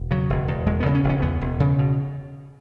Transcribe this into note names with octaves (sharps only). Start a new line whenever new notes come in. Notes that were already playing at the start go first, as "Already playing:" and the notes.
Already playing: E1
C#3 F#3
E1
E2
E1 G#3
B3
C#3
C#4
E1
C#4
E2 B3
E1
C#3
B2